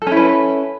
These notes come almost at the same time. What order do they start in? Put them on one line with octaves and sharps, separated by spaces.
A4 C#4 E4 B4